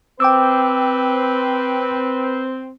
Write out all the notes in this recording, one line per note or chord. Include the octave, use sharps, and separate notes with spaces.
C4 B4 G5 D6 E6